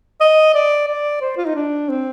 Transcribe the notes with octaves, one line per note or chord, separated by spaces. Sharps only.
D#5
D5
D5
C5
F4
D#4
D4
C4